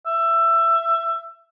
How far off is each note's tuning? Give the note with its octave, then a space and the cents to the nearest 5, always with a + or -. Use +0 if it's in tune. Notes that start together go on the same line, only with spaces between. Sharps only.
E5 +15